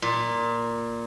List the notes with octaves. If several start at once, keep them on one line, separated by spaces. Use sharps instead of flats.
A#2